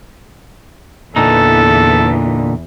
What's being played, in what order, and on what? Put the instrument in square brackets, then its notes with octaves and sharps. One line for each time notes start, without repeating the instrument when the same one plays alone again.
[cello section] E2 E3 [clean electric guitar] A#2 D3 D#4 [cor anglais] A4